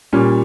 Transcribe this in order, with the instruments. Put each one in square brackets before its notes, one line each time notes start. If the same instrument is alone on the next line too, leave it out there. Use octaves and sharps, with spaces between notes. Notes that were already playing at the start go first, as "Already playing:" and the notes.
[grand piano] A#2 G3 C#4